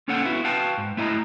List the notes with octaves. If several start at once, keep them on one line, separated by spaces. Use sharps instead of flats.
A#3 C#4 D#4 A4 C#5 F#5
B3 E4 F#4
F#4 B4 F5 G5 A5
G#2
A3 E4 D#5 A#5